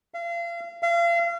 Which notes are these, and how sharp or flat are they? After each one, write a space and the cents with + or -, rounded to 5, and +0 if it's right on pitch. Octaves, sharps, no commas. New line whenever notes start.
F5 -35
F5 -35